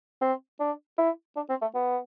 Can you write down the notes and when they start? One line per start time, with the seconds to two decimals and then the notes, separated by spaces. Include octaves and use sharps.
0.21 C4
0.60 D4
0.98 E4
1.36 D4
1.49 C4
1.61 A3
1.75 B3